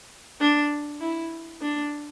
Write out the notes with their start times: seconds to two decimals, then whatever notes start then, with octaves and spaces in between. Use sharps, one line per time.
0.41 D4
1.01 E4
1.62 D4